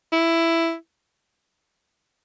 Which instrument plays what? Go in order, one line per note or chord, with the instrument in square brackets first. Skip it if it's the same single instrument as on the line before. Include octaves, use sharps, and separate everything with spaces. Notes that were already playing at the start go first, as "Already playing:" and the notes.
[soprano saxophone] E4